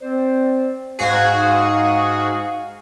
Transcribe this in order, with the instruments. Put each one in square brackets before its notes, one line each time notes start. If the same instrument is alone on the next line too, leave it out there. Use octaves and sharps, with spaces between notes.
[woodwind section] C4 C5 D5
[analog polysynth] G#2 F#4 G#4 [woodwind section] F5